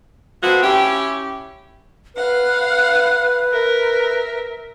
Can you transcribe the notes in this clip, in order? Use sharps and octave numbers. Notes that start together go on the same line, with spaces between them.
A3 B3 C4 F4 F#4
C#4 E4 G4
B4 F5 F#5
A#4 E5